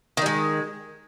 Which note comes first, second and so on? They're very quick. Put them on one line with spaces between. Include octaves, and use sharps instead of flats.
D#3 G3 G#3